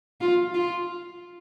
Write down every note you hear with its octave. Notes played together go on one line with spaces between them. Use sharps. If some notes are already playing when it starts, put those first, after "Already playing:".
F4
F4